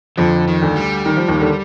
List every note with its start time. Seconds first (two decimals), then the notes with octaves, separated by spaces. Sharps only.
0.17 F2 D3 F3
0.48 D#3
0.62 D2 D3
0.76 G3
1.06 D#3
1.17 F3
1.28 D#2 D#3
1.41 D3